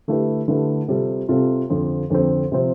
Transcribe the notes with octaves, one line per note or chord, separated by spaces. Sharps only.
D3 A3 E4 G4 B4
D3 A3 E4 G4 B4
C3 G3 C4 F4 A4
C3 G3 C4 F4 A4
F2 D3 F3 C4
F2 D3 F3 C4
C3 F3 C4